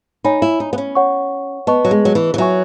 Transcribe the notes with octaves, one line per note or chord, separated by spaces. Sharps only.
D#4 C#5 G#5 B5
E4
D#4
B3
C#4
C#5 F#5 C#6
B3 B4 D#5 A5 C#6
F#3
G#3
F#3
E3
E3
F#3 C#5 E5 G#5 C#6